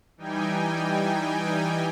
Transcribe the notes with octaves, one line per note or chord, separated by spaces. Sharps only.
E3 G3 D#4 G5 G#5